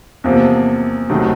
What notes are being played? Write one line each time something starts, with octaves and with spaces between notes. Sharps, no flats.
E2 C3 F3 A#3
C#2 C3 D#3 F#3 A3